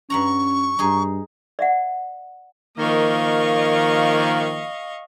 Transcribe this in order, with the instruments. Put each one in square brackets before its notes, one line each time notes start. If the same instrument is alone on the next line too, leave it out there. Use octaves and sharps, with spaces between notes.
[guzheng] G2 F#5 A#5 [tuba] C#4 [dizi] C#6
[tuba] G2 [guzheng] D#4 G#4
[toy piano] D5 E5 F#5
[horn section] D#3 F3 A#3 [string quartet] D#5 F5 C#6